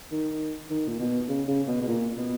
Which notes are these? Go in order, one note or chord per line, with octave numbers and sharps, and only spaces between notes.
D#3
D#3
A#2
B2
C#3
C#3
B2
B2
A#2
B2